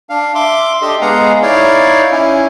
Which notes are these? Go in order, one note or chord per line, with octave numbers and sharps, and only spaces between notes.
D4 F5
E5 C6 D6
D4 G4 A4 D#5 C6
G#3 B3 G#4 F5 F#5 A#5
D#4 E4 C#5 D5 F5
C#4 E4